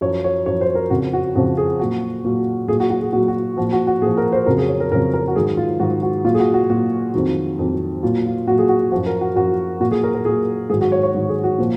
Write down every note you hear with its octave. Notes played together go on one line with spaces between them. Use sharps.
F#2 F3 C#5
C#5
F#2 F3 C#5
C5
A#4
F2 C#3 F3 F#4
F#4
F2 C#3 F3 F#4
G#4
A#2 F#3 F#4
A#2 F#3
A#2 F#3 G#4
F#4
F#4
G#4
A#2 F#3 F#4
F#4
A#2 F3 F#4
F#4
F#4
A#2 F3 G#4
A#4
C5
F2 C#3 F#3 A#4
G#4
C#5
A#4
F2 C#3 F#3 A#4
A#4
F#4
G#2 D#3 F#3 G#4
F4
G#2 D#3 F#3 F#4
F#4
A#2 F#3 F4
G#4
F#4
F#4
A#2 F#3 F#4
F2 D#3 F#3
F2 D#3 F#3
A#2 F#3 F4
F4
A#2 F#3 F#4
G#4
F#4
F#2 F3 F#4
A#4
F#4
F#2 F3 F#4
A#2 F#3 F#4
G#4
A#4
A#4
A#2 F#3 G#4
G#2 D#3 F#3 G#4
F#4
C#5
C#5
G#2 D#3 F#3
G#4
F#4
A#2 F3